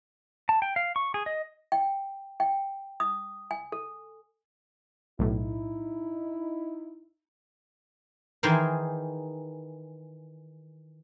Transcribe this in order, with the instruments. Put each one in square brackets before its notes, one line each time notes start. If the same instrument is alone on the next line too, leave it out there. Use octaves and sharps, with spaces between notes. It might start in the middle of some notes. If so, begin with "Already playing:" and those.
[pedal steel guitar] A5
G5
F5
C#6
G#4
D#5
[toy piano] G5
G5
D#6
G#5
A4
[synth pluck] B1 A2 [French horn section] D#4 E4
[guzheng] D#3 E3 D#4 G#4 A#4 C5